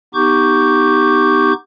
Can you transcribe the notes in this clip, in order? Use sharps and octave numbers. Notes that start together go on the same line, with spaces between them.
B3 D#4 G4 C#6 D6 G6